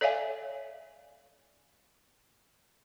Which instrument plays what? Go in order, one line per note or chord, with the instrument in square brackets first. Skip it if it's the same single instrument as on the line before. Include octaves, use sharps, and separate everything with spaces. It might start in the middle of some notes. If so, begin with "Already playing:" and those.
[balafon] A4 C#5 D5 E5 F5 G#5